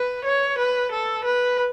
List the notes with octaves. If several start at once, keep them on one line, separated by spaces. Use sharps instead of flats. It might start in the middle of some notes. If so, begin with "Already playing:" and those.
Already playing: B4
C#5
B4
A4
B4